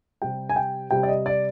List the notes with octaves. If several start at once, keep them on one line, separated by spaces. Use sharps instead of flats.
C3 G3 G5
G#5
G5
C3 G3 G5
D5
D#5
D5